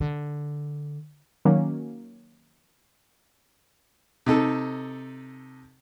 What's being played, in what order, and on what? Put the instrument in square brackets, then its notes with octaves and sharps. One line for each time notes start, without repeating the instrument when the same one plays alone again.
[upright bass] D3
[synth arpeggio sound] D#3 F#3 A#3 C#4
[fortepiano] C3 D#4 A4